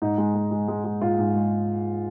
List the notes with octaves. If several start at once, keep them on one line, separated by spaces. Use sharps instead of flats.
G#2 D#4
G#3
G#3
G#3
G#3
G#3
G#2 F4
G#2
G#3